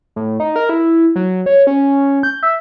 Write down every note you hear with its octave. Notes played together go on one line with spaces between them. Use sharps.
A2
D#4
A#4
E4
F#3
C#5
C#4
G6
E5